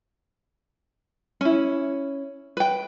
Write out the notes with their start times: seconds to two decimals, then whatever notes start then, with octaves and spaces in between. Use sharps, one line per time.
1.41 C#4 E4
2.57 B4 G5